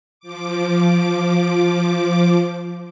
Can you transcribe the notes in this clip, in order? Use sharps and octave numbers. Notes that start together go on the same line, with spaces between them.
F3 D6